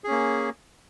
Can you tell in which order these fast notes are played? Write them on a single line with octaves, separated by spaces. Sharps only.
G#4 C#4 A#3